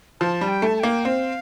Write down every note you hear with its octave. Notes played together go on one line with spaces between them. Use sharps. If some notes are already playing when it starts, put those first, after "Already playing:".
F3 A5
G3
G5
A3 A5
A5
A#3 G5
C4 F5